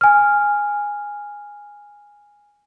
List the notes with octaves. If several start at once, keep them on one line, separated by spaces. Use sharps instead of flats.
G#5 F6